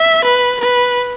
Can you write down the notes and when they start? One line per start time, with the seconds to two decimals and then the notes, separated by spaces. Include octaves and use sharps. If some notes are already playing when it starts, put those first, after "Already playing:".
Already playing: E5
0.25 B4
0.61 B4